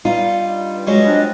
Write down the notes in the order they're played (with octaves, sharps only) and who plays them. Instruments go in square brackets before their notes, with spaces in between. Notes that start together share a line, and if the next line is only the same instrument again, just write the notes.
[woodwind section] G2 G3 [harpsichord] D#4 [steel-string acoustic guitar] F4
[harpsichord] F#3 G#3 C#4 [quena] D#5
[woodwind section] C4 D4